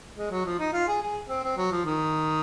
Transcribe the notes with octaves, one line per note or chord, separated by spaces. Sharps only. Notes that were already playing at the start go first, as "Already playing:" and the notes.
G#3
F#3
F3
D#4
F4
G#4
G#4
C4
C4
F#3
F3
D#3